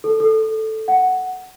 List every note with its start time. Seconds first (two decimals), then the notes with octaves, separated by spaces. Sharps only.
0.04 A4
0.20 A4
0.88 F#5